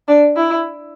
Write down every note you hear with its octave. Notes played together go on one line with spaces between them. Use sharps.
D4
E4